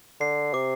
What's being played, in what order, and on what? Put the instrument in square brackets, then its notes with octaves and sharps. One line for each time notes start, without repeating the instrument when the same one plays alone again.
[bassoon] D3 [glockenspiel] C7
[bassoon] C3 [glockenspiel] D6